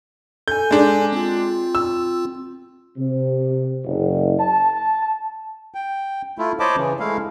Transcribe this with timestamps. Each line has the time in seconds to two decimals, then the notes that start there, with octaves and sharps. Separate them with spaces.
0.48 A4 G#5 G6
0.71 G#3 D4
1.12 C4 F4
1.75 E6
2.97 C3
3.85 F#1
4.39 A5
5.74 G5
6.38 A3 E4 F4
6.60 C5 C#5 D#5 A5 B5 D6
6.76 C#3 E3
7.00 G#3 A3 E4 F5